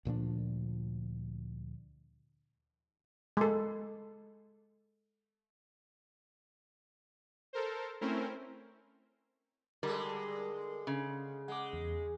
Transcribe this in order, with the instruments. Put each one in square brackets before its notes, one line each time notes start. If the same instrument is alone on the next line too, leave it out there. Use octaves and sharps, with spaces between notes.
[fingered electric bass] D2 A#2 F3 D4
[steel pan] G#3 A4
[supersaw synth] A4 A#4 C5
A3 C4 C#4 E4 A#4 C5
[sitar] D3 G#3 [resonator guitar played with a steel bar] G3 [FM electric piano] A#4
[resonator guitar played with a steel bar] C#3
[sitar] G#3 [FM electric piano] F#5 D6
[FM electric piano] E2